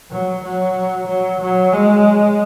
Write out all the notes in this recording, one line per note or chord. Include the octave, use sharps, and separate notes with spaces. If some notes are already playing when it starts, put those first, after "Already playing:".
F#3
F#3
F#3
F#3
G#3